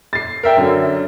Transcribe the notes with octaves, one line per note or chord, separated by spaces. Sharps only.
A6 C7
A#4 E5 G5
F#2 D3